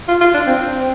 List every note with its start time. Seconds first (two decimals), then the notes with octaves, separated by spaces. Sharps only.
0.09 F4
0.21 F4
0.34 D4
0.47 C4